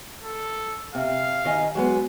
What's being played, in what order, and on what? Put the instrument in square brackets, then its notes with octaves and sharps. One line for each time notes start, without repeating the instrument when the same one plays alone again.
[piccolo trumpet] A4
[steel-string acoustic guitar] C3 [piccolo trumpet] F5
[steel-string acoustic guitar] D#3 D#5 G#5
F#3 G#3 B3